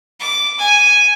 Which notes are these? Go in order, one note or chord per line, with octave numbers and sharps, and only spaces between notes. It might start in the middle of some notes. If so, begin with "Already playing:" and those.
D6
G#5